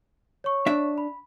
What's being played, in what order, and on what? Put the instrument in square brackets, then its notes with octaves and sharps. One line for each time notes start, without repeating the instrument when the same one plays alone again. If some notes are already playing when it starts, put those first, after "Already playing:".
[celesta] C#5 C#6
[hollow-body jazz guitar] D4 E5
[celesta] B5